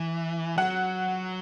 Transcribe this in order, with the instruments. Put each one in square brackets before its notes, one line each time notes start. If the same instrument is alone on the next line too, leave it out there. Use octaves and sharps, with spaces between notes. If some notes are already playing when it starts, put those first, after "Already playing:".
Already playing: [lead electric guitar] E3
[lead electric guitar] F#3 [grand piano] F#5